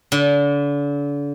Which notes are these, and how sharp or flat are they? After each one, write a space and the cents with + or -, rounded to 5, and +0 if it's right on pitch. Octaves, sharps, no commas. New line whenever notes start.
D3 -35